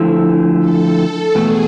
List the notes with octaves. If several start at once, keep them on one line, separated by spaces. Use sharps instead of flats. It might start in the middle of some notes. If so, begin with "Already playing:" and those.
Already playing: D3 F3 A3 E4
A4
E2 B2 A3 G#4